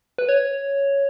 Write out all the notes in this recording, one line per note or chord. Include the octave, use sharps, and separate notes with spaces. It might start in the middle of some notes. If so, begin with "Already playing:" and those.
B4
C#5